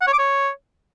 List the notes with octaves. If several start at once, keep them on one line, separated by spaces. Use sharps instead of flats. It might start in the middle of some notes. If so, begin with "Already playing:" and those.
F#5
C#5
D6
C#5